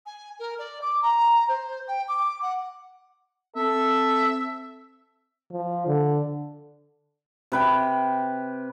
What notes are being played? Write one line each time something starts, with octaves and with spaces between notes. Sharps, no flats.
G#5
A#4
D5
D6
A#5
C5
G5
D6
F#5
C4 A4 E5
F3
D3
C3 B4 G5